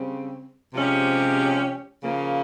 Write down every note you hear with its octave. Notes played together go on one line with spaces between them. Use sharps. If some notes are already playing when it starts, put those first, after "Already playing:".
Already playing: C#3 G3 C4
C3 F3 G#3 C#4 G4
C#3 F3 A#3